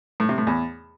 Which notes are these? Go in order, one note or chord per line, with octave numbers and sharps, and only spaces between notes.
A2
C3
A2
E2